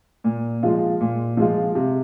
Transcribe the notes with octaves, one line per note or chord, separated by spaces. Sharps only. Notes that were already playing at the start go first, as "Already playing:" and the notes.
A#2
F3 G#3 F4
A#2
F3 G#3 F4
C3